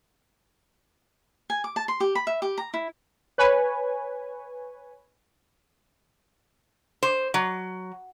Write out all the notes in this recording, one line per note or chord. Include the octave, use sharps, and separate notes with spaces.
G#5
D6
A5
C6
G4
B5
E5
G4
A#5
E4
B4 C#5 G#5
C5
F#3